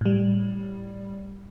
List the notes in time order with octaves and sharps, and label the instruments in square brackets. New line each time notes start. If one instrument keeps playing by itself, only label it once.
[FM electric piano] A2 G3